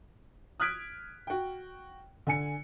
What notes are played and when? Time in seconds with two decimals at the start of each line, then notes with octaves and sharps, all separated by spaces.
0.60 D#6 F6 F#6 G#6 B6 D7
1.27 F#4 G5
2.27 D3 G#5 C#7